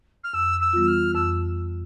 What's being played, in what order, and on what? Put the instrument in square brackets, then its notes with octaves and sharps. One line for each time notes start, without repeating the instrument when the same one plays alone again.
[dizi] F6
[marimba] F2 [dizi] E6
[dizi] E6
[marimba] E3 G3 B3 F4
[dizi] F6
[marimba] F2 [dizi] E6